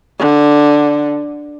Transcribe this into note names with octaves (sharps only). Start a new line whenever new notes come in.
D3